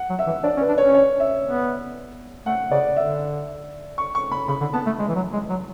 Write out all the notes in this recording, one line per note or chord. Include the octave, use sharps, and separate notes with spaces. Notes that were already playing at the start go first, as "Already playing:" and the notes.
Already playing: F#5
F#3
E5
E3
D4 D5
C#4
B4
D4
C#4 C#5
C#5
E5
B3
A3 F#5
C#3 D5
D3 E5
C#6
C#6
B5
C#3 B5
D3
B3 A5
A3
G#3
E3
F#3
G#3
F#3